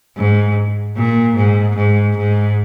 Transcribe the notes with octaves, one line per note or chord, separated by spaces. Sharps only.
G#2
A#2
G#2
G#2
G#2